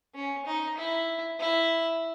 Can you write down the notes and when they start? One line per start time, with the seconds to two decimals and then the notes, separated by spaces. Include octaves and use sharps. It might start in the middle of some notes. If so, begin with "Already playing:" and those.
0.14 C#4
0.46 D#4
0.77 E4
1.40 E4